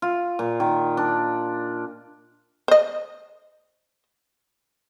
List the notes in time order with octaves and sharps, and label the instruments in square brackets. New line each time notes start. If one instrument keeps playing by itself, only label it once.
[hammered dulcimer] F4
A#2
D#3
D4
[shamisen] C5 D#5